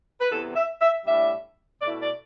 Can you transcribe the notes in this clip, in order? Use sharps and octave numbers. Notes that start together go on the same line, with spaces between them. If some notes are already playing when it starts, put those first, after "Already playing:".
B4
E2 C3 E3 B3 A4
E5
E5
A2 G3 D4 E5
B2 A3 E4 D5
D5